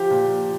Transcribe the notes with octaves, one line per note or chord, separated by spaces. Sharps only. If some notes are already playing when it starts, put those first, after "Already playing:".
Already playing: F3 G4
A#2